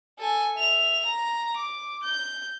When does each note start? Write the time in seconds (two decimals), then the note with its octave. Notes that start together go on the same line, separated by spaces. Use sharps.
0.19 A4 G#5
0.56 E5 F7
1.06 A#5
1.56 D6
2.03 G6